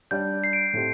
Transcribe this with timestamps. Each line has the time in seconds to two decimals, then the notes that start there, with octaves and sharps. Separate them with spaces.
0.11 G3 D4 G4 D5 G6
0.44 C7
0.53 D7
0.73 A2 A3 C4 D#4 G4